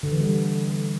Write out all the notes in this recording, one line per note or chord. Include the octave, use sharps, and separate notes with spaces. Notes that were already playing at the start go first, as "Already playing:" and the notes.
D3
E3
G3